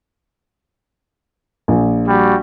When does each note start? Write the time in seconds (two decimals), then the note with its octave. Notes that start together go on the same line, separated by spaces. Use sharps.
1.68 A#1
2.08 G3 F#4